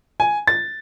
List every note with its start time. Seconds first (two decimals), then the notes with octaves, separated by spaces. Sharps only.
0.20 G#5
0.47 A6